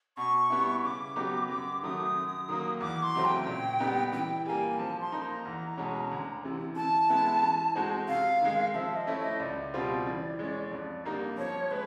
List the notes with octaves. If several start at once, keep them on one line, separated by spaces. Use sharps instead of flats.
B2 C#6
G3 B3 E4
C#3 D6
F#3 B3 D#4 G4
F#2 D6
D#3 F#3 A3 D#6
F#2
D#3 F#3 A#3
E2 D6
C6
C#3 F#3 A3 C4
G5
A#2
G3 B3 D#4
E3 G5
G3 A#3 G#5
F3 A5
C6
A#3 D#4
A#5
E2
B2 G#3 C#4
D2
C3 E3
E3 A5
G#3 B3 E4
E3
G#3 C4 D#4 F#4
C3 F5
D#3 G#3
F3 E5
D#5
A3 C#4 E4
D#5
C#2 D5
B2 G3 C4 F4
E3
G#3 C#4
F2
D3 G3 A#3 D#4
F3 C#5
G#3 B4